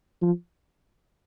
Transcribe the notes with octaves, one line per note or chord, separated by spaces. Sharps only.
F3